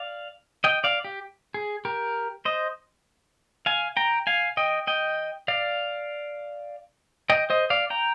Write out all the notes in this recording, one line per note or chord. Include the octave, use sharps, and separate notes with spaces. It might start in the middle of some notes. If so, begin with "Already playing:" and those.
Already playing: D5 F5
D#5 G5
D5 F5
G4
G#4
G4 A#4
C5 D#5
F5 G#5
G5 A#5
F5 G#5
D#5 G5
D#5 G5
D5 F5
D#5 G5
C5 D#5
D5 F5
G5 A#5